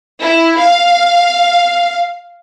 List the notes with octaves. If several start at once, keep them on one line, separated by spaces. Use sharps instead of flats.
E4
F5